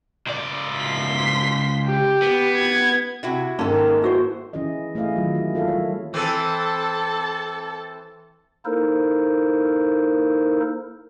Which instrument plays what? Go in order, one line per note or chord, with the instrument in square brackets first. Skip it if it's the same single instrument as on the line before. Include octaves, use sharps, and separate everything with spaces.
[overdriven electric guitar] C#2 D5
[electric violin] C6 B6
G4
[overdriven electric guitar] B3
[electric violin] G#6
[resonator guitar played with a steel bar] C3 E4 F#4
[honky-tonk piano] G#2 A#3 A5 [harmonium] D#3 [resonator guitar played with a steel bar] C#4 A4
[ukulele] E4 F#4 C5
[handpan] E3 C#4 E4 G#4 D#5
A3 E4 G#4 D#5 F5
D#3 E3 F#3 F4
E4
A#3 F4 A4 E5 F5
G3 C#5
[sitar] E3 C4 [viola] A4 A5
[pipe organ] A#3 D#4 E4 A4 A#4 C5